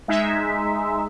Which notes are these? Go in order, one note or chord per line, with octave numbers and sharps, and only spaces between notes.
G#3 D#4 E5